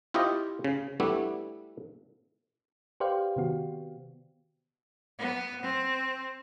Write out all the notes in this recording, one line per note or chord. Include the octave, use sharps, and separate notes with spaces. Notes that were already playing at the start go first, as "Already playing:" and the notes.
E4 F4 G4 C5 D#5
C#3
G3 A3 B3 D4 E4
G4 B4 C5 D5 F5 G5
C3 D#3 B3 F#4
B3
C4